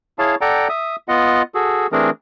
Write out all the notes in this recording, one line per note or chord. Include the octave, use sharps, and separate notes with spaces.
E4 G#4 C#5 F5 A5
A4 D5 F#5 G5 A#5
E5 D#6
B3 F4 D#5 F#5
F#4 G#4 A4
E3 A3 C4 D4 G#4 A#4